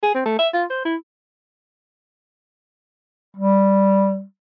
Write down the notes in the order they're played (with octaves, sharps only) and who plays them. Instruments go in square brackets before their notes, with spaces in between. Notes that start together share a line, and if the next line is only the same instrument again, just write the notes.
[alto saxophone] G#4
C4
A3
E5
F4
C5
E4
[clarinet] G3